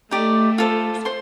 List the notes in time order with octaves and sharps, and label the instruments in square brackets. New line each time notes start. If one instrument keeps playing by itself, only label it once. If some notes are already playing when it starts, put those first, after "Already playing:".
[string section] A3 [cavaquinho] D#4 G4 D5
[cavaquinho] F4 A4 C5
C5 C6